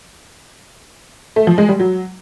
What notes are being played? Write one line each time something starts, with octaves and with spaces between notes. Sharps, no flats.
A3
F3
G#3
G3
F#3